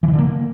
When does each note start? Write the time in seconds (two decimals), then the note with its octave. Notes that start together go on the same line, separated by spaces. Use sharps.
0.03 E3
0.08 D#3
0.13 D3
0.18 A#3